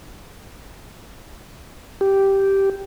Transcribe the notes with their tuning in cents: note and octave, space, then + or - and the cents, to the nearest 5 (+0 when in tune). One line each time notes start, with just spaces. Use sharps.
G4 -5